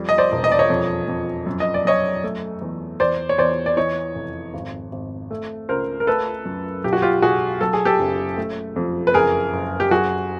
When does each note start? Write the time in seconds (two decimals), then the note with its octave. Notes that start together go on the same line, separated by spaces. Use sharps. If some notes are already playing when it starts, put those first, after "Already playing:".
Already playing: F2 G3
0.09 D#5
0.18 C5 D5
0.32 E1
0.44 D#5
0.52 D5
0.59 C#5 D#5
0.70 F2
1.08 F2
1.46 F#2
1.60 D#5
1.74 D5
1.85 F#2 C#5 D#5
2.24 A3
2.62 E2
3.00 E2 C5 D5
3.29 C#5
3.38 E2 C5 D5
3.66 D5
3.77 E3 C#5 D#5
4.15 F1
4.54 G#1
4.92 G#1
5.31 A3
5.69 C#2 A#4 C5
6.00 A#4
6.07 A3 A4 B4
6.45 F#2
6.84 B1 G4
6.93 F#4
7.02 F4 G4
7.22 B1 F#4 G#4
7.61 F#3 A4
7.73 G#4
7.85 G4 A4
7.99 F#1
8.37 A3
8.76 F2
9.07 B4
9.14 F#1 G#4 A#4
9.53 F#1
9.80 G4
9.91 F#3 F#4 G#4